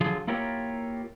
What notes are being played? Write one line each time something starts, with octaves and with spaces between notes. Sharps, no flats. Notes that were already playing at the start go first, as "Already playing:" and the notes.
D3 F3 F#3 F4 G#4
A#3 E4 F4 G4 A#4 C#5